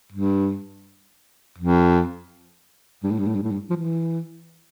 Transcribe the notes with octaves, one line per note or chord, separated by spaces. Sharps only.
G2
F2
G2
A2
G2
A2
G2
A2
G2
F3
E3